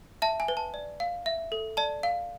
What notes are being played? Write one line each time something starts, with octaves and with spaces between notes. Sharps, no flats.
E5 A5
G#5
B4
A5
D5
F5
E5
A4
D5 A5
F5